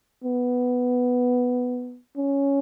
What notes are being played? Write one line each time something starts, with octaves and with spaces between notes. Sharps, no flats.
B3
C#4